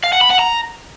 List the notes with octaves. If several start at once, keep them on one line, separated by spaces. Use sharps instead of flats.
F5
F#5
B5
F#5
A#5